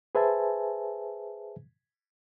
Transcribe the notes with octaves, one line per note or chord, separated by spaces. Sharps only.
G#4 B4 C5 E5 G#5 A5